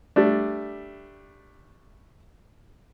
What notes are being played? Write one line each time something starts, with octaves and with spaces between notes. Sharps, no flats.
G3 A3 D4